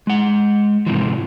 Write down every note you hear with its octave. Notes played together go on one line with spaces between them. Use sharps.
G#3 F#5
G#2 C3 E3 F3